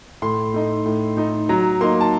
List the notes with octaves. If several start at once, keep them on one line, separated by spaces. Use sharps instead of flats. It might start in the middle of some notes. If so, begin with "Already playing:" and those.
A2 C6
A3 D#4
A2
A3 D#4
F#3 A#5
A#3 D#4 C6
A5